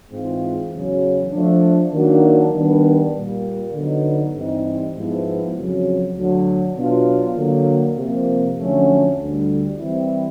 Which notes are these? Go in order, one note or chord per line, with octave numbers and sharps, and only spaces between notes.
G#2 E3 G#3 C4 F4
E2 C#3 F#3
F3 A3 D4
D#3 F#3 A#3 D4 F#4
D#3 G3 B3 D4
A#2 G3 A#3
D3 F#3 B3 D#4
G2 E3 G3 C4 D#4
G#2 F3 G#3 B3 E4
F2 C#3 F#3
D2 D3 F#3
B2 F#3 B3 D4 F4
D3 F#3 A#3
C3 F3 A#3
F2 D3 F#3 A3 C#4
D2 D3 G3
E3 G3 C4 E4